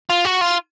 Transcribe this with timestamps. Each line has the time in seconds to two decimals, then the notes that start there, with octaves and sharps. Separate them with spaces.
0.10 F4
0.25 F#4
0.41 F4